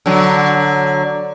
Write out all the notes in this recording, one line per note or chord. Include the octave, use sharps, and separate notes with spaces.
D3 F#3